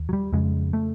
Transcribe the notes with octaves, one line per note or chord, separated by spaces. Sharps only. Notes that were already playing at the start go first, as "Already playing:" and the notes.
Already playing: D#2
F#3
G3
F2 C#3 G#3
A3